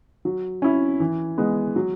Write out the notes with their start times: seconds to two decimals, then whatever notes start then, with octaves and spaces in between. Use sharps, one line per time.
0.25 F#3
0.62 C#4 E4
1.00 E3
1.38 G#3 B3
1.76 F#3